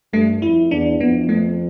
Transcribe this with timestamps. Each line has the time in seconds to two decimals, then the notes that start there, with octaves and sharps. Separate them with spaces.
0.13 G2 A3
0.42 F2 E4
0.71 E2 D4
1.00 F2 B3
1.29 A3